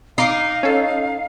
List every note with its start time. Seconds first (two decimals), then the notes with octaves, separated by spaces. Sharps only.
0.18 D#4 F5 D6 C7
0.63 C#4 A4